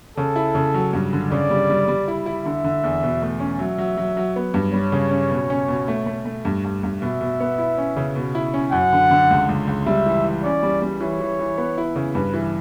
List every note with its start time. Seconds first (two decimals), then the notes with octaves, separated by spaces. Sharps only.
0.17 C#3 A4
0.36 E4
0.55 C#3
0.74 F#3
0.93 G2
1.13 D3
1.31 C#3 D5
1.50 G3
1.70 G3
1.88 G3
2.08 E4
2.26 E4
2.45 D3 E5
2.64 D3
2.84 E2
3.03 B2
3.22 A3
3.40 C#4
3.59 F#3 E5
3.78 F#3
3.97 F#3
4.17 F#3
4.36 B3
4.54 G2
4.73 G3 C#5
4.92 C#3
5.11 C#4
5.31 B2
5.50 C#4
5.68 B2
5.88 A3
6.06 A3
6.25 A3
6.45 G2
6.64 G2
6.83 G2
7.02 B2 E5
7.21 B2
7.40 B3
7.58 E4
7.78 C#4
7.96 C#3
8.16 B2
8.35 E4
8.54 C#4
8.72 F#2 F#5
8.92 D3
9.11 D3
9.31 C#2
9.49 C#2
9.67 C#2
9.86 G3 E5
10.06 E3
10.24 E3
10.44 C#4 D5
10.63 G3
10.82 G3
11.01 E3 C#5
11.20 E3
11.40 E3
11.58 B3
11.78 E4
11.96 C#3
12.15 G2 B4
12.34 E3